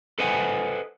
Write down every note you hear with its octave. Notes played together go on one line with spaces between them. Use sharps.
A4 B4 C5 D#5 F#5 G#5